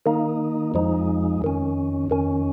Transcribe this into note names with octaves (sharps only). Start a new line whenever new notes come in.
D#3 A#3 D#4
F2 F3 G#3 D#4
F2 D#3 C#4
F2 D#3 C#4